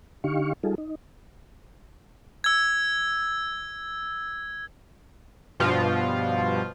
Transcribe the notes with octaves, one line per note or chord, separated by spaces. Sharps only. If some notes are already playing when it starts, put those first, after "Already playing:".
D3 D#4 G4 F5 C#6
G3 D#4 F4 G#4 A4
D#4
E6 G#6
G2 B2 F3 F4